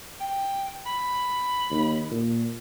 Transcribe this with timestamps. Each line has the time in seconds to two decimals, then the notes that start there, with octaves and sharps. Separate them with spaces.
0.21 G5
0.86 B5
1.70 D#2
2.11 A#2